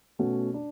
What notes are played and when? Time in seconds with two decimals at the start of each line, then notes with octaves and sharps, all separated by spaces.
0.19 B2 A3 C#4 F#4
0.54 D4